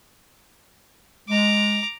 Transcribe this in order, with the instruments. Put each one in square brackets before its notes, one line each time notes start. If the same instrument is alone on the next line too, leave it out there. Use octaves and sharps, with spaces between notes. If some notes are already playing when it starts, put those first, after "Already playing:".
[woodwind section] G#3 [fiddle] A#5 D6